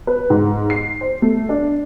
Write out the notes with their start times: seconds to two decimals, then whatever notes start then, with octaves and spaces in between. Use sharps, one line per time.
0.07 B4
0.30 G#2
0.70 C7
1.01 C5
1.22 A3
1.49 D4